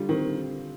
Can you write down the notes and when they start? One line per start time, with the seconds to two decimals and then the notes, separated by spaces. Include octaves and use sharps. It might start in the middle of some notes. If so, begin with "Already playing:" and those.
Already playing: D3 G3 F4
0.09 D#3 C4
0.24 D3